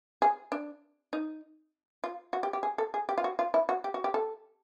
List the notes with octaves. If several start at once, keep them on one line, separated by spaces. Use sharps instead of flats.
G#4
D4
D#4
F4
F#4
G4
G4
G#4
A4
G#4
G4
F4
F#4
F4
E4
F#4
G4
F#4
G4
A4